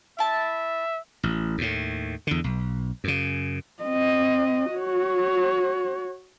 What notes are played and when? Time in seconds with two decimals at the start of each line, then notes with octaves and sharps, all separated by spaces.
0.19 E4 E5 A5
1.23 A1
1.58 D#2 A2
2.27 E2 D3
2.44 B1
3.04 F#2 C#3
3.83 C4 D#5
4.72 F#4 C#5